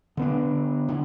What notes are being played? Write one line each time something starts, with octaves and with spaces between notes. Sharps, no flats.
D3 B3 D4
D3